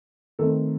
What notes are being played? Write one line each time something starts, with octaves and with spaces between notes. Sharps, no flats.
D#3 A3 C4 A4